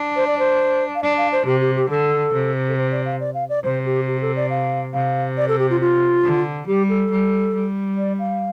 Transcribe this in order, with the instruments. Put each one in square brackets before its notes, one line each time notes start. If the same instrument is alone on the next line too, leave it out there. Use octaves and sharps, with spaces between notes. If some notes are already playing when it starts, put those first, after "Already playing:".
Already playing: [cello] D4
[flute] C5
D5
C5
F5
[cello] D4 [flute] D5
[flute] F5
C5
[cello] C3 [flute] G4
[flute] G4
G4
[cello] D3 [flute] A4
[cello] C3
[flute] A4
C5
D5
F5
D5
F5
D5
[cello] C3 [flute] C5
[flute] G4
G4
A4
D5
F5
[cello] C3 [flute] F5
[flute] D5
A4
G4
F4
F4
[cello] D3
[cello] G3 [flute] G4
[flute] A4
[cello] G3
G3
[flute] D5
F5